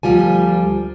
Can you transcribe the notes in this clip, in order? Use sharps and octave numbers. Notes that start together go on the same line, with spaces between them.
D2 F3 G3 F4 G#5